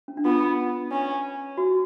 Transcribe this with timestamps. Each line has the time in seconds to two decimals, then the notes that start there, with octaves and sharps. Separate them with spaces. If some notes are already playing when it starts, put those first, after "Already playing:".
0.08 C#4
0.17 D4
0.25 B3 F4
0.92 C#4
1.58 F#4